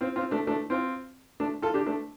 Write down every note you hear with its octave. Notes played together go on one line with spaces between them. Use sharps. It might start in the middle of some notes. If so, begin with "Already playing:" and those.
C4 F4
C4 F4
A3 D4
A3 D4
C4 F4
A3 D4
F4 A4
D4 G4
A3 D4